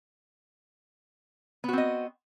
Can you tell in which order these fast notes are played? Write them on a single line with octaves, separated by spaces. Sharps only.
B3 F#4 C4 D#5